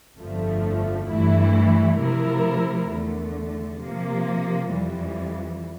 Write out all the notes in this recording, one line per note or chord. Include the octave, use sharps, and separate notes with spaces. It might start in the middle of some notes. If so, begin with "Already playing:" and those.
G1 F2 D3 F3 A3
G2 E3 A3 E4
C3 F3 A3 E4 A#4
E2 D3 A3
C3 F3 A#3
F2 E3 G3